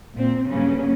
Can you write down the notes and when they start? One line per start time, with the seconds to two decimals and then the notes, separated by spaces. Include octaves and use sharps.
0.15 A#2 C4
0.50 G2 C#3 F#3 A#3 C#4